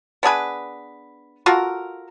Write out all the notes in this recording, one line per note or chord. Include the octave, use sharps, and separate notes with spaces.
B3 D4 G#4 B4
F4 F#4 A4 A#4